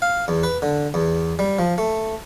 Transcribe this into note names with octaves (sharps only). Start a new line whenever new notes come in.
F5
E2
B4
D3
E2
G3
F3
A3